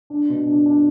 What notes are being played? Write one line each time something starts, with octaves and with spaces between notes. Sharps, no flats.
D4
B2
D4
D4